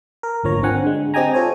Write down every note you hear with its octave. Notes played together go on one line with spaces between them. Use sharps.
A#4
G#1 D2 F3 A#3 C#5 A#5
D3 C4 F#5 G#5
D3 G#3
C4 G4 D#5 G5 G#5 A#5
F4 A4 C5 C#5 G#5